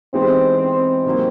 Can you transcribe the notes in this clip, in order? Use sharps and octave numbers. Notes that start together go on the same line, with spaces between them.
E3 G#3 B3 C4 D#4 G4
C4
C3 D#3 F#3 A#3